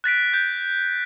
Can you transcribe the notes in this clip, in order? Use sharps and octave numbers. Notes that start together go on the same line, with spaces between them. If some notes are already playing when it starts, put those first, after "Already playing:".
F#6 A6 B6 D7
G6